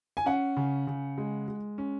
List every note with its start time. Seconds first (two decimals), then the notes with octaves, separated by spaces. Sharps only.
0.17 G#5
0.26 C#4 F#5
0.57 C#3
0.87 C#3
1.18 G#3
1.48 G#3
1.78 C#4